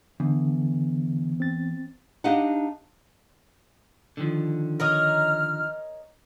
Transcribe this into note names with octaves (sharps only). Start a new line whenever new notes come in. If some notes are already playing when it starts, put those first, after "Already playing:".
E2 D3
C4 A6
D4 D#4 G4 D#5 F5 F#5
D3 D#3 F3
A#4 C#5 D#5 F6